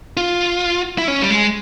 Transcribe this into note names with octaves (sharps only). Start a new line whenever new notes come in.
F4
E4
C#4
G3
G#3